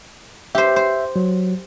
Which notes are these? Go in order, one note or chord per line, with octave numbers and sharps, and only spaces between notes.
G4 C5 E5
C5
F#3